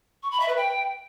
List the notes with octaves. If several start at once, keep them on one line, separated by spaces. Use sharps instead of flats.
C#6
B5
E5
B4
G5